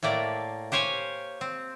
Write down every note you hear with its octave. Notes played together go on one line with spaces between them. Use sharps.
A2 A3 A#3 D5
G4 C5 C#5 F5 G#5
C4